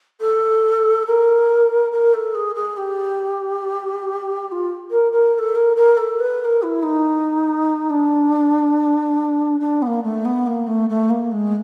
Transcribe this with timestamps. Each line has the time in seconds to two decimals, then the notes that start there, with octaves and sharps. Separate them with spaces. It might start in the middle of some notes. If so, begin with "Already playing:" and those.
0.20 A4
1.06 A#4
1.92 A#4
2.13 A4
2.34 G#4
2.55 G#4
2.77 G4
4.48 G4
4.51 F4
4.90 A#4
5.12 A#4
5.34 A#4
5.38 A4
5.55 A#4
5.76 A#4
5.97 A4
6.19 B4
6.40 B4
6.44 A#4
6.62 E4
6.82 D#4
7.90 D4
9.60 D4
9.82 B3
9.86 A#3
10.03 A3
10.25 B3
10.46 A#3
10.67 A3
10.89 A3
11.09 A#3
11.31 G#3